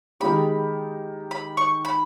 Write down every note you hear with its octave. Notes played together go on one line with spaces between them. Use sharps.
D#3 G#3 D#4 G4 B5
B5
C#6
B5